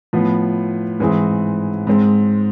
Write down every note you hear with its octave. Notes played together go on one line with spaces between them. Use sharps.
A2 F3 B3
G#2 E3 G#3 C4 G#4
G#2 G#3 C4